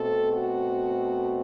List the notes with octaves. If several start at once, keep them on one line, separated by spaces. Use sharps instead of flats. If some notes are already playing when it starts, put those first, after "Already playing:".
Already playing: B2 A3 C4 A4
F#4